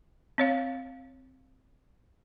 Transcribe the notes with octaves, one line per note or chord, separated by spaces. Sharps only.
C4 C#5 F5